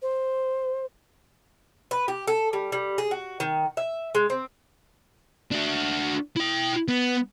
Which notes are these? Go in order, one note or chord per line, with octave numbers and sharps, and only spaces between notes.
C5
B4
G4
A4
G3
G3
G#4
F#4
D#3
E5
G#3
C4
D4 F#4
E4 G5
B3